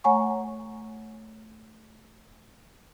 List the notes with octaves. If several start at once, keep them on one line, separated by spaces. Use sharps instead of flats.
A3 C#5 F#5 G#5 A#5 C#6